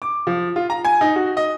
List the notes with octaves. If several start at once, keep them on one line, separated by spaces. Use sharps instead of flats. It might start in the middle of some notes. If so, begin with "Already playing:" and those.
D6
F3
F4
A#5
G#5
D#4
F#4
D#5